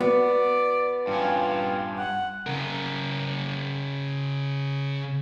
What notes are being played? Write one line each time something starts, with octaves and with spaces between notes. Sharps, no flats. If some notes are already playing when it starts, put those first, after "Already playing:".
B3 F#4 D5
G2 C#4 F4
F#5
C#3 A#4